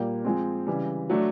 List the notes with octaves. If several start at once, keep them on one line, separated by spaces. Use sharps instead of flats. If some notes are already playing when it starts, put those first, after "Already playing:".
Already playing: A#2 G3 A#3 G5
F3 G#3 C4
C#3 E3 G3
F#3 A3 D4